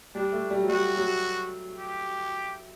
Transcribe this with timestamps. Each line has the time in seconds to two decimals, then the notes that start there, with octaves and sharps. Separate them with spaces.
0.15 G3 D4
0.33 A3
0.50 G3
0.61 F#3
0.69 G3 F#4
0.96 F#3
1.78 G4